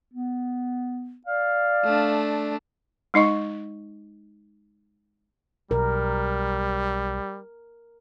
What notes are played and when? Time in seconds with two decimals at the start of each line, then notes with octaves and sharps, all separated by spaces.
0.13 B3
1.26 D5 F5
1.85 A3 D4
3.14 G#3 D#4 D#5 C#6
5.71 B1 G3 A#4